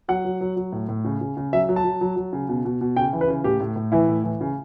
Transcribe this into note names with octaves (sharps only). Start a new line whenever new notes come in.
F#3 F#5
F#3
F#3
F#3
A2
A2
C#3
C#3
C#3
F#3 E5
F#3
A5
F#3
F#3
F#3
C#3
B2
B2
B2
C#3 G5
E3
B4
C#3
A2 G4
A2
A2
E3 E4
A2
E3
C#3